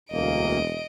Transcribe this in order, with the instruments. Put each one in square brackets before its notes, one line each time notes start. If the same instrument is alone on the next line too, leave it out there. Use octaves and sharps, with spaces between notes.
[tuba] E1 [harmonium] D2 A#3 [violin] D#5 D7